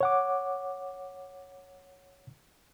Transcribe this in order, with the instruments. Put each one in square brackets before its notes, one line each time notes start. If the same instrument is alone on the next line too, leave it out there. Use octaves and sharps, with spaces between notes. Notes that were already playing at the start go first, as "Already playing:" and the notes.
[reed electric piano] C#5 F#5 D6